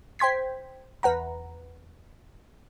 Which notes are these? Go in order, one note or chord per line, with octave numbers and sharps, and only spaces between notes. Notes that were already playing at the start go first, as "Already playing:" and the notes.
C5 G5 C6 G#6 B6
E2 B4 F#5 A#5